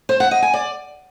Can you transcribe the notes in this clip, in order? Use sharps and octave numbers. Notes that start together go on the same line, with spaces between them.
C5
F#5
D#5
G#5
D5